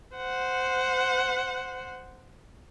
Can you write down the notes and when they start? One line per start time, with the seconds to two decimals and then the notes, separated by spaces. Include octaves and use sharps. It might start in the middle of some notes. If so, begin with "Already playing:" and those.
0.17 C5 F#5